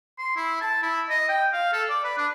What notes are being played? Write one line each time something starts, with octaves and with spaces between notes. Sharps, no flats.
C6
E4
A5
E4
D#5
G5
F5
A4
D5
B4
D4